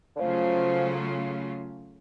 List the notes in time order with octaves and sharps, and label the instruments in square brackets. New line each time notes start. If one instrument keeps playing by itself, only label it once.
[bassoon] D3
[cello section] C#3 F#3 A3 C#4 F4 [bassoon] F3